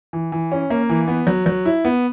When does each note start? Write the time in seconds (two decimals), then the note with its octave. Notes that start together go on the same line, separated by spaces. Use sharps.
0.13 E3
0.32 E3
0.52 C#4
0.70 A#3
0.89 E3
1.08 B3
1.27 F#3
1.46 F#3
1.65 E4
1.85 B3